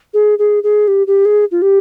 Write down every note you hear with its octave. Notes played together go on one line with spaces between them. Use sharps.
G#4
G#4
G#4
G4
G4
G#4
F4
G4